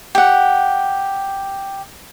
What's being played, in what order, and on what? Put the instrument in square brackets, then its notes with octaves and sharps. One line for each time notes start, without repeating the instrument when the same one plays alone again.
[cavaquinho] G4 F#5